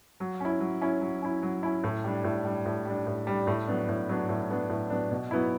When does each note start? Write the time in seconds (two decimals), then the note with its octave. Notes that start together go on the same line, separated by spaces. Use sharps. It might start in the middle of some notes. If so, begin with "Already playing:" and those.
0.20 F#3
0.40 C#4 E4
0.60 F#3
0.82 C#4 E4
1.01 F#3
1.22 C#4 E4
1.43 F#3
1.63 C#4 E4
1.84 A2
2.04 G3 D4
2.24 A2
2.45 G3 D4
2.66 A2
2.85 G3 D4
3.07 A2
3.27 G3 D4
3.47 A2
3.67 F#3 B3 D4
3.89 A2
4.09 F#3 B3 D4
4.29 A2
4.50 F#3 B3 D4
4.70 A2
4.90 F#3 B3 D4
5.11 B2
5.31 F#3 B3 E4